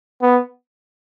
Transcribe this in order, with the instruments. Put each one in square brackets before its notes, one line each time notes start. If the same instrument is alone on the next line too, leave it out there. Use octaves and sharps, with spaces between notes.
[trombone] B3